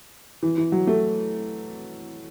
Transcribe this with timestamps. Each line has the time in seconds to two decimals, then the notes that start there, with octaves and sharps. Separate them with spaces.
0.43 E3
0.58 E3
0.72 F#3
0.87 A3